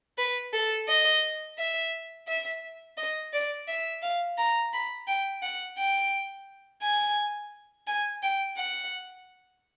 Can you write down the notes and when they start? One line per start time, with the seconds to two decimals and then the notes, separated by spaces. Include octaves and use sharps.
0.18 B4
0.53 A4
0.88 D#5
1.58 E5
2.28 E5
2.97 D#5
3.33 D5
3.68 E5
4.03 F5
4.38 A#5
4.73 B5
5.07 G5
5.42 F#5
5.78 G5
6.82 G#5
7.87 G#5
8.22 G5
8.57 F#5